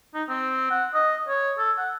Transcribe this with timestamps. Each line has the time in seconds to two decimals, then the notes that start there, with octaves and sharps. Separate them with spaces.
0.14 D#4
0.29 C4
0.71 F#5
0.94 D#5
1.28 C#5
1.58 A4
1.78 F#5